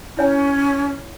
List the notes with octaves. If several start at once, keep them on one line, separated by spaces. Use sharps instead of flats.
C#4 E4 C#5 G#5